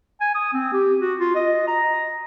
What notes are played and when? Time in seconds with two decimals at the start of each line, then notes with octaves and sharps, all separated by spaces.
0.21 G#5
0.35 D#6
0.53 C4
0.73 G4
1.00 F#4
1.19 F4
1.35 D#5
1.67 A#5